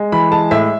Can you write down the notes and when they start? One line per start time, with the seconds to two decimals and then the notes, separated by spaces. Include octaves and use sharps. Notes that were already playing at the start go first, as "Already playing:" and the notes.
Already playing: G#3
0.12 E3 B5
0.32 G#3 A5
0.51 A2 E5